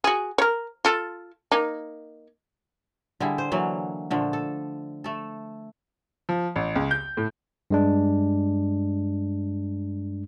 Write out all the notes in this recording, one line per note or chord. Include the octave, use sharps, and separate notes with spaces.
F#4 G#4
A#4 C#5
F4 A4
A#3 D#4
D3 G3 E4 G#4
C5
D3 E3 F#3 A#3
A#2 D3 F3 A3
A4
A3 A4
F3
A1
C#2
G6
A2
G2 G#3 D4